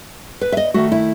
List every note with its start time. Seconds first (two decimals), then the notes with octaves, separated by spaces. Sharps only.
0.41 B4
0.52 E5
0.57 D#5
0.74 D#3 A3 F#4
0.92 E4